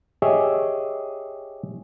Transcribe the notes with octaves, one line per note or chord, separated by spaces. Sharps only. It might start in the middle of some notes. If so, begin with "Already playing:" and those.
G4 G#4 C#5 D#5 E5